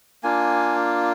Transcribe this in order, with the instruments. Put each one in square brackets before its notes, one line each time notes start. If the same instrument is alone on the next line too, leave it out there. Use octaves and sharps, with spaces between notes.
[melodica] A#3 D4 F4 G#5